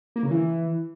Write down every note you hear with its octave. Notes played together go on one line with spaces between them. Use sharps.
A#3
C#3
E3